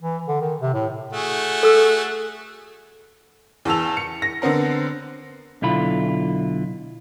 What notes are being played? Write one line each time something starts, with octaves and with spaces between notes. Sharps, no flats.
E3
D3
D#3
C3
A2
A3 F#4 G#4
A4 E6
E2 E3 A5 E6 F7
C#7
A#6
D3 B3 C4 A#4
B1 D3 E4 F4 B5